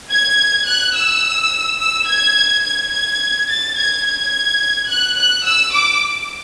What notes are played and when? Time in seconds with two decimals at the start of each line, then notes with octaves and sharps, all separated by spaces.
0.11 G#6
0.67 F#6
0.95 E6
1.80 E6
2.07 G#6
2.64 G#6
2.92 G#6
3.49 A6
3.76 G#6
4.05 G#6
4.89 F#6
5.17 F#6
5.45 E6
5.73 D6